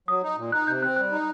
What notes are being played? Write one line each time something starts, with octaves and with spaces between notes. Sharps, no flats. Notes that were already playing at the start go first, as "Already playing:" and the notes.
F#3 D#6
D#4
A#2
D#4 F#6
C3 G6
C4 F#6
G3 F#6
D#4